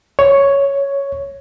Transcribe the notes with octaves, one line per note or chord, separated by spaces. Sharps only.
C#5